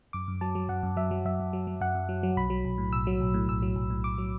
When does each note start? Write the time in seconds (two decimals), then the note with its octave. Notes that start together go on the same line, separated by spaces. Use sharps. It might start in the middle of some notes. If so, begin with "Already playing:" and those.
0.13 F#2 D6
0.28 F#2
0.41 F#3 A5
0.55 F#3
0.69 F#2 F#5
0.83 F#2
0.97 F#3 E5
1.11 F#3
1.25 F#2 E5
1.40 F#2
1.53 F#3
1.67 F#3
1.81 F#2 F#5
1.95 F#2
2.09 F#3
2.23 F#3
2.37 B1 B5
2.50 F#3
2.65 B1
2.78 A2
2.93 B1 E6
3.07 F#3
3.21 B1
3.34 A2
3.48 B1 E6
3.62 F#3
3.76 B1
3.90 A2
4.04 B1 D6
4.18 F#3